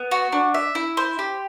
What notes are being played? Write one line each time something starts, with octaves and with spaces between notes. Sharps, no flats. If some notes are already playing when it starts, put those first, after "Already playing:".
Already playing: B3
F#4
D4
E5
E4
C5
G4